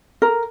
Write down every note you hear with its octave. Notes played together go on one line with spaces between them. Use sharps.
A#4